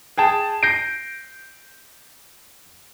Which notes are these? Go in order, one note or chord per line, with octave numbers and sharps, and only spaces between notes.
G#4 G5 A5
G6 A#6 C7 D7